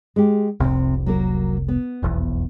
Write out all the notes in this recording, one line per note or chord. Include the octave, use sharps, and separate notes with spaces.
G#3 G4
F1 C2 C3
F#3 A#3 A#4
B3
F1 B1 E2